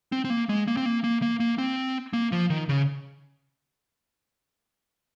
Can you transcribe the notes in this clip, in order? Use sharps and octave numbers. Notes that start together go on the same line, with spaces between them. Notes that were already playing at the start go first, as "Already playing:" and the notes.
C4
C4
A#3
G#3
A#3
C4
A#3
A#3
A#3
A#3
C4
A#3
F3
D#3
C#3